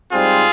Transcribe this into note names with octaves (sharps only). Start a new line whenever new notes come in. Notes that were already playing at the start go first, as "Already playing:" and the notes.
G#2 G3 C4 F4 G#4